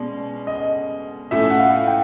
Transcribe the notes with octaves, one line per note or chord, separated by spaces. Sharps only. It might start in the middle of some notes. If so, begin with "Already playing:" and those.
Already playing: B2 G#3 C#4 D5
D#5
A2 F3 A3 C#4 F#4 E5
F#5
F5
G5